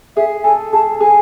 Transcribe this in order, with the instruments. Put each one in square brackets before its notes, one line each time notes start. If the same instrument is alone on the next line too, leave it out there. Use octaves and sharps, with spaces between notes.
[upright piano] G#4 [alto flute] E5
[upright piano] A4 [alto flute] G#5
[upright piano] G#4 [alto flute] A5
[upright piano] G#4 [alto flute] G#5